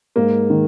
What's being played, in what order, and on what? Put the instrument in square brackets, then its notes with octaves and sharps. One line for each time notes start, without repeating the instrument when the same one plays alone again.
[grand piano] G#2 [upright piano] A#3
[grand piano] D#3